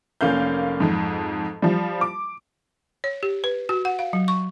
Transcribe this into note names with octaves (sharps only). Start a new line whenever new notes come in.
F1 A#3 C#4 F5 G6
F2 G#2
F3 G3
D6
C#5
G4
B4
F#4
F#5
F5
F#3
C#6